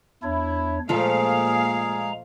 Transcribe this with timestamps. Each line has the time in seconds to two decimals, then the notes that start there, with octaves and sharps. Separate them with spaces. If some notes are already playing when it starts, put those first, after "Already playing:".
0.23 E2 D4 E4 C#5
0.89 A#2 F3 G#3 A3 G#4 A4 F5 A#5